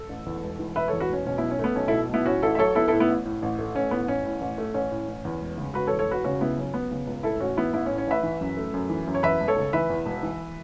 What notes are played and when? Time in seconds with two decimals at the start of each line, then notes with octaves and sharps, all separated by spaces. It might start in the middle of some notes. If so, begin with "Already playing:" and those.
Already playing: A4
0.09 A1
0.26 E2
0.43 E1
0.59 E3
0.76 E1 B4 E5
0.88 E2 A4 C#5
1.00 F#4 B4
1.09 E1 C#4
1.26 B2 C#4
1.38 B1 B3 E4
1.51 C#4
1.59 A3 B3
1.76 B1 C#4
1.88 B2 E4 A4
2.09 B1 B3 E4
2.26 A2 C#4 F#4
2.43 A1 E4 A4
2.55 E5
2.59 F#3 A4 C#5
2.75 B3 E4 A4
2.88 E4 A4
2.92 A2
3.00 B3 E4
3.09 A1
3.25 A2
3.42 A1
3.59 A3
3.75 A1 C#4
3.91 A2 B3
4.08 A1 C#4
4.24 A2
4.41 A1
4.58 A3
4.74 A1 C#4
4.91 A2
5.08 A1
5.25 E2
5.41 E1
5.57 C#3
5.74 E1 F#4 B4
5.87 A4 C#5
5.91 E2
5.99 A4 C#5
6.08 E1 F#4 B4
6.24 C#3 C#4 F#4
6.41 C#2 B3 E4
6.58 F#3 C#4
6.74 B3
6.91 C#3
7.07 C#2
7.23 A2 E4 A4
7.40 A1 C#4 F#4
7.57 E3 B3 E4
7.74 A1 B3 E4
7.86 C#4
7.90 A2
7.98 C#4
8.07 A1 B4 E5
8.23 E3
8.41 F#2
8.57 A3
8.74 F#2
8.90 E3
9.07 F#2
9.15 C#5
9.23 E2 B4 E5
9.40 E1
9.48 A4 C#5
9.56 C#3
9.73 E3 B4 E5
9.90 E2
10.06 E1
10.23 E3